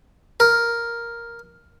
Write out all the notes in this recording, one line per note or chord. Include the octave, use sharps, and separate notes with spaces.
A#4